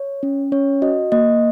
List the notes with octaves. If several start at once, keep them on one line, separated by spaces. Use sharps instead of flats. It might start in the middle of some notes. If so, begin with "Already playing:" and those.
Already playing: C#5
C#4
C#4 C#5
F#4 D#5
A#3 D#5